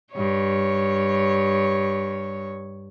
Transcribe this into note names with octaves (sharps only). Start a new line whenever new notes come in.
G2 C#5